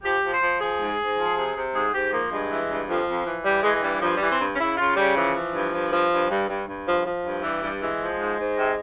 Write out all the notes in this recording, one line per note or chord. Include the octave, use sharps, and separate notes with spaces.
F3 G4
F3
C5
F3
F3 G#4
G#2
G#2
F3
C3
C3
G#2 G#4
G#2 G4
F3 A#3
G2 G#3
E3
G2
F2 F3
F2
E3
E3 G3
E3 G#3
G#3
G2 G3
G2 F3
G3
E3
C4
G2
C#4
C#3 E4
C#3 F4
C#3 G3
E3 F3
E3
G2
G2
F3
G2
G2
G2
G2
F3
F3
G2
E3 G3
G2 G3
E3 G#3
F3
G#2
G#2
C3